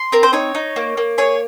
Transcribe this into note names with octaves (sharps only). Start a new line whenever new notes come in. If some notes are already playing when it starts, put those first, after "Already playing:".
Already playing: C6
C4 A#4
C5
D#4 C#5
D#4
A#3
A#3
G#4 C#5